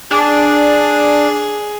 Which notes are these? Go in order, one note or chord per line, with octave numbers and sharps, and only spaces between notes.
D4 G#4